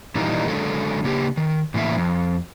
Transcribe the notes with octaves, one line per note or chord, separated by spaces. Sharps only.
A#2 D#3 E3 G3 A#3 D#4
D3 F#3 G#3 A4
C#3 A#3 G4
D#3
A2 E3 A#3 E5
F2